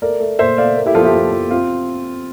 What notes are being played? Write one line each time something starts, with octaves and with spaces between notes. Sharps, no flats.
A3 A#4 D5
A3
A#2 C5 E5
A3 D5 F5
A#3
E4 G4
F3 F4 A4
E4 G4
F3
F3
C4 F4